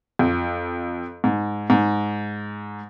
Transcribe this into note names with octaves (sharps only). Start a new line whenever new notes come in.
F2
G#2
G#2